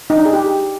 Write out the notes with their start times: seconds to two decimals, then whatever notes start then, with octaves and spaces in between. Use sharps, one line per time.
0.10 D#4
0.18 D4
0.25 G#4
0.33 G4